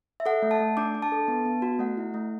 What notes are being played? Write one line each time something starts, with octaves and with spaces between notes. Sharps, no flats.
E5
A4 F#5
A3
A5
A3
D4 D6
D4
A5
A4
B3
B3
F#4
A3 F#5
E4
A3